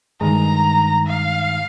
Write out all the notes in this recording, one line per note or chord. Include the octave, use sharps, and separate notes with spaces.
G2 D#3 G#3 A#5
F5